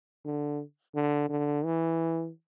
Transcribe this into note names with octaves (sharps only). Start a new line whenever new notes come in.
D3
D3
D3
E3